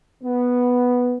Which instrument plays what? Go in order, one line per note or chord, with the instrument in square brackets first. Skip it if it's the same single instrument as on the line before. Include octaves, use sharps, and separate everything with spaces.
[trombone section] B3